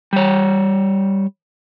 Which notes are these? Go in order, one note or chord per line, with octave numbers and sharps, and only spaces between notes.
G3 C#5